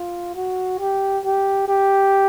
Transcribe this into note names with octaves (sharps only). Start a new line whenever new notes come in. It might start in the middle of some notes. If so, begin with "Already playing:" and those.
Already playing: F4
F#4
G4
G4
G4